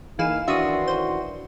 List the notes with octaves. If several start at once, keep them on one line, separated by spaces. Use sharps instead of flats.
E3 A#3 D#4 G#4 F5 E7
F#2 D#3 E3 D4 F#4 E5 C6 D#6
C5